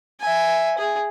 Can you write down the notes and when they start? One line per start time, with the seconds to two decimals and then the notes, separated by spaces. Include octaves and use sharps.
0.20 E5 G#5
0.78 G#4